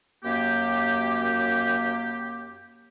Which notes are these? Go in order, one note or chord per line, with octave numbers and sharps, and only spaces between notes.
F#2 A#3 G4